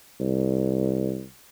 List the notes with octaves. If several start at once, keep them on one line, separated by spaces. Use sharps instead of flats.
C2